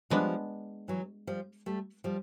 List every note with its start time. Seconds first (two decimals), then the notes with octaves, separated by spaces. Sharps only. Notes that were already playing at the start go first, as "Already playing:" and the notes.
0.10 F3 G3 G#3 B3 D4
0.88 E3 F#3
1.27 F3 G3
1.66 G3 A3
2.04 F3 G3